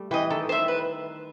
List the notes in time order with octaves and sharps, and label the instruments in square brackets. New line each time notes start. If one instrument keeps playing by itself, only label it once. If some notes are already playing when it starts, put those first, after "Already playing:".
Already playing: [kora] G3 A3
[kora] E3 [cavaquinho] D#5 G5
[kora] D#3 [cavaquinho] A4
[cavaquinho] C5 E5
B4